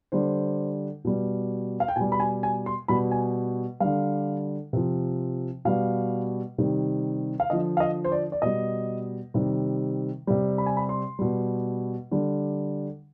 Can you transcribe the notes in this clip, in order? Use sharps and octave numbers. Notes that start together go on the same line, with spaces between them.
D3 G3 C5
B2 G3
F5
G5
B2 G3 G#5
B5
G#5
G#5
C6
B2 G3 B5
G#5
D3 G3 F5
C3 F3
B2 G3 F5
C3 D#3 G3
F5
D3 F3 D#5
F5
D#5
C5
D5
D5
B2 G3 D#5
C3 D#3 G3
C3 G3
B5
G#5
B5
C6
B2 G3
D3 G3